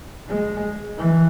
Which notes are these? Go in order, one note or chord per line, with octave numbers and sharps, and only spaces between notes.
G#3
E3